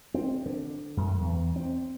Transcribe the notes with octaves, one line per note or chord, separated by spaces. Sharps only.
C4
D3
F#2
E2
C4